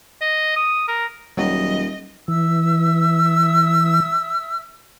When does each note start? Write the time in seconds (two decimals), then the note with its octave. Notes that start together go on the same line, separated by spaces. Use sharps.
0.21 D#5
0.56 D#6
0.88 A#4
1.37 D#1 F#3 G3 D#5
2.28 E3 E5 E6